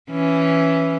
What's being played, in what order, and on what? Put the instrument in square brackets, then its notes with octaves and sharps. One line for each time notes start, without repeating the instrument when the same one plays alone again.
[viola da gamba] E3 C#4